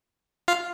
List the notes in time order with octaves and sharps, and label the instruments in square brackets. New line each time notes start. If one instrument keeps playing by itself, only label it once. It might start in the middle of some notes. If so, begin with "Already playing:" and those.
[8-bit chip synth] F4 F5